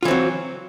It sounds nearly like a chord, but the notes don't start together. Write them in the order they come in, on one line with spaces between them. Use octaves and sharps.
F4 E3 C4 F#3